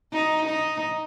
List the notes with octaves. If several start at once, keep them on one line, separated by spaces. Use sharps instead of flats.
D#4
D#4